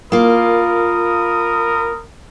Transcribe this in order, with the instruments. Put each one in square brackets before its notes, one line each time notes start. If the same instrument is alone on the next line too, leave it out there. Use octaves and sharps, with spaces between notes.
[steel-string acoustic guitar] A#3 F4 [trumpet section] A#4 B5 D#6